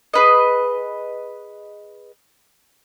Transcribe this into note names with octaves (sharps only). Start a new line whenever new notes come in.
G#4 B4 D#5